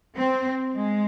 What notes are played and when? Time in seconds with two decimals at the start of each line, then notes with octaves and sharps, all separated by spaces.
0.16 C4
0.75 G#3